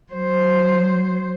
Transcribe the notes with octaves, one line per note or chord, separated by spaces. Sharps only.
F#3 C5